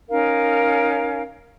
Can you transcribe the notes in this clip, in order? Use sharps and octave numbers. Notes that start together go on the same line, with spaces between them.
C#4 D#4 A#4 F5